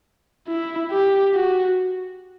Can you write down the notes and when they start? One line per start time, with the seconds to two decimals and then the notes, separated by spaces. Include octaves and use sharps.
0.48 E4
0.91 G4
1.34 F#4